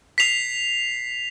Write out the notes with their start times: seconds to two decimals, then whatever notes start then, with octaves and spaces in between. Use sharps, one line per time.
0.18 B6 C7 F7